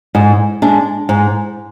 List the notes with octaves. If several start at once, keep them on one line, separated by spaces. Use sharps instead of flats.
G#2
G#3 D4
G#2